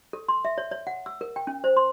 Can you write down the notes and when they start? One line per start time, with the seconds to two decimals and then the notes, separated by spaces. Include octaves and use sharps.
0.13 A4
0.28 C6
0.45 E5
0.58 C#5
0.71 C#5
0.87 F#5
1.06 E6
1.21 A#4
1.36 G5
1.47 C#4
1.64 C5
1.77 C6